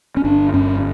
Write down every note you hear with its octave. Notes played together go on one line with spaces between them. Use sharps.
C#4
G1 D4
G2 C#4